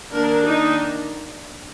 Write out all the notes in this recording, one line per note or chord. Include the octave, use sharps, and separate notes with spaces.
D#3 A#3 D4 A#4
D#4